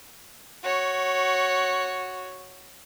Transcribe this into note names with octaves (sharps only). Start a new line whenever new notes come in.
F#4 C#5